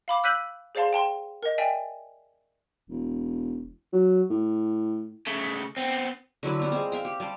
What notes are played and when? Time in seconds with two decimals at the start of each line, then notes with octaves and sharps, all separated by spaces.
0.08 F5 B5 D6
0.24 E6 F#6 G6 B6 D#7 F#7
0.75 G#4 C5 D5 F5 A5 C6
0.93 G5 A5 C6
1.42 A#4 D#5
1.58 D5 E5 G5 G#5
2.90 E1
3.93 F#3
4.30 A2
5.27 C#3 A3
5.77 B3 C4
6.43 D3 F#3 E4 B4
6.59 G3 C4 F4
6.72 G#3 C4
6.92 E5 F5 G5
7.05 G4
7.20 G3 D5 A5 C6